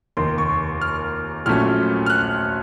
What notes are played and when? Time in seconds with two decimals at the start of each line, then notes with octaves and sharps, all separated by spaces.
0.17 F1 D#2 D#3 C6
0.38 C#6
0.81 F6
1.46 A#1 A#2 F#3 A3 C#4 F6
2.06 F6
2.10 F#6